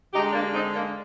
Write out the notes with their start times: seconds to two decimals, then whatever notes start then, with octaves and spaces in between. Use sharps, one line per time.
0.14 D3 D#4 G4
0.17 G#3
0.33 A#3 D4
0.54 C4 D#4
0.74 A#3 D4